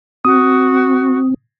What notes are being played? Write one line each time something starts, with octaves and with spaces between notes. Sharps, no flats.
C4 F#4 D#6